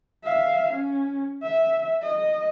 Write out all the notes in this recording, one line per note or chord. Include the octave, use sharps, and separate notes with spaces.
E5 F5
C#4
E5
D#5